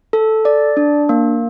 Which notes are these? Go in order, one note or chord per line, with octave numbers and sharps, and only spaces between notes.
A4
D5
D4
A#3